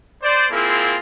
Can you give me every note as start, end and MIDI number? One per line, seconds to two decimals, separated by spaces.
0.23 0.46 72
0.23 0.46 74
0.52 0.98 58
0.52 0.98 60
0.52 0.98 64
0.52 0.98 65
0.52 0.98 68
0.52 0.98 70